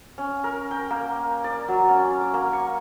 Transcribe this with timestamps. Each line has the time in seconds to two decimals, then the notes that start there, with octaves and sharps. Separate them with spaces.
0.18 C#4
0.44 A#4
0.71 G5
0.91 A#3
1.44 D5
1.68 F#3
1.89 C#4
2.21 D6
2.34 A#3
2.53 C#6